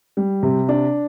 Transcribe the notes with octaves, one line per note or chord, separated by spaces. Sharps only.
G3
C3
D4